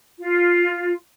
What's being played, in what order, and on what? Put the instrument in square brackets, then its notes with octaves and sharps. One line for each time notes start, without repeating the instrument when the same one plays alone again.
[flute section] F4